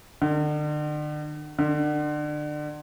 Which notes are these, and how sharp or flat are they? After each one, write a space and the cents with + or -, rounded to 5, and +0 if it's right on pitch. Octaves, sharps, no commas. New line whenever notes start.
D3 +40
D3 +30